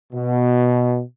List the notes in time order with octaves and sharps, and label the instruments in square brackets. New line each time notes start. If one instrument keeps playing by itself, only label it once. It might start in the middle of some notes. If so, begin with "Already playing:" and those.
[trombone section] B2